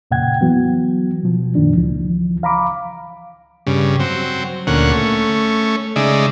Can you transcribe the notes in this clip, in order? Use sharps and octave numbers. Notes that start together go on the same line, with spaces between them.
F2 A#2 C#3 F#5 G5 G#6
E3 F#3 B3
B2 F3
F#2 A#2 D#3 D4
C#2 E3 F3
F5 A#5 B5 D6
G2 C#3
F#3 C4
D2 A#2 C#4 F#5
A3 C#4
C#3 G#3 D#4 D5 E5